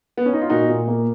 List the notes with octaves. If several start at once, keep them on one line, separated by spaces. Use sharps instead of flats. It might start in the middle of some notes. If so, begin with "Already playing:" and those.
B3
C#4
D#4
F4
A#2 D#4 F#4
A#2
A#3